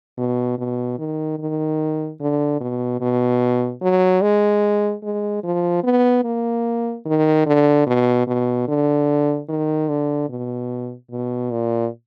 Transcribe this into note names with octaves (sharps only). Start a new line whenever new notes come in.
B2
B2
D#3
D#3
D3
B2
B2
F#3
G#3
G#3
F3
B3
A#3
D#3
D3
B2
B2
D3
D#3
D3
B2
B2
A#2